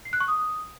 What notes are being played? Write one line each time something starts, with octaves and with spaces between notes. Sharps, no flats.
C7
F#6
C#6
D#6